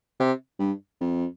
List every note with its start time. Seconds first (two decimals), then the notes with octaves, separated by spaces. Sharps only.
0.20 C3
0.59 G2
1.01 F2